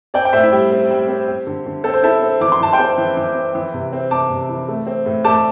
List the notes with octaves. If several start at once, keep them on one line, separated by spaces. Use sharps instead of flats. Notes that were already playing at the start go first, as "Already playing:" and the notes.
C4 D5 G5
G5
A2 C5 E5
E4
G3 G4
C4
G3
C4
C4
D3
D3
C4 A4
C5
C4 E4 A4
C4
E3 D6
C6
E3 A5
G5 C6
C4
E3
E3
C4
E3
C3
C4
C3 A5 D6
C3
E3
A3
C4
A2
A3 A5 D6